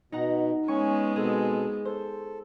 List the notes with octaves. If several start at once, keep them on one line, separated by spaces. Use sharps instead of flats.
B2 D#4 F#5 A#5
G#3 B3 C#4 G#5 C#6
B2 C4 G#4 A4
A4 C5